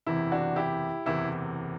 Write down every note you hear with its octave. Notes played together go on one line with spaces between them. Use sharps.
F#1 E2 C3 E3 E4
D4 F#4
E4 G4
F#1 E2 C3 E3 E4